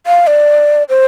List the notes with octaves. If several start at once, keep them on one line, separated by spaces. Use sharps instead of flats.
F5
D5
C5